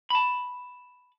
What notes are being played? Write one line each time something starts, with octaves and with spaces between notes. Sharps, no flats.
A5 B5